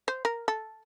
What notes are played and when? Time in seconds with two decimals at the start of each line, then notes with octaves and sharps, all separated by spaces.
0.08 C5
0.25 A#4
0.48 A4